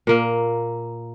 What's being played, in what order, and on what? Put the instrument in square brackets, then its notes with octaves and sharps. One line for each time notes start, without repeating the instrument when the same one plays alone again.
[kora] A#2 A#3